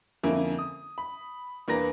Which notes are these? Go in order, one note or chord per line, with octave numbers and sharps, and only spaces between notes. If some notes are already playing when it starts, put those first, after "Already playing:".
F2 D3 A#3 C#4 E4
D#6
B5
E2 A#3 D4 B4 A#5 A#6